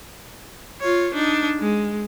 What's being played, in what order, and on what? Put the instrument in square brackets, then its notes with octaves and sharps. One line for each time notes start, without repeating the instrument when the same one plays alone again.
[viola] F4 C#5
D4 D#4
G#3